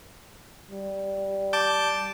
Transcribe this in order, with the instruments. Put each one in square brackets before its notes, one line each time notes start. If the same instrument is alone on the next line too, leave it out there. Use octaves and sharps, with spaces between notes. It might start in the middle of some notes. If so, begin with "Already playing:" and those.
[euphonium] G3
[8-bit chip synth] A5 D6 G6